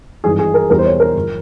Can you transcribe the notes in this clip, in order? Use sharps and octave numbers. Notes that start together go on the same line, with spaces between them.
G#1 G2 E3 G#4
G#4
A#4
E1 E2 E3 G3 A#4
C5
C#5
A#4
G1 F3